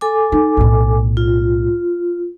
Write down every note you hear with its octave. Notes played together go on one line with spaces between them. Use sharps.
A4 G#5 D6
D#4
B1 A2
F4